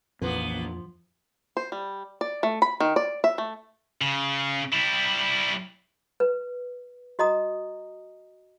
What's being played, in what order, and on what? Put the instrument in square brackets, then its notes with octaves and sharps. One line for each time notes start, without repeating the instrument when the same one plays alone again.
[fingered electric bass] A#1 A#2 E3 [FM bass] F2 [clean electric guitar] F3 [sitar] A#3 B3
[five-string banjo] C5
G3
D5
A3
B5
D#3
D5
E5
A3
[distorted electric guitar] C#3
G3 E4
[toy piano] B4
F#4 D#5 A#5 D#6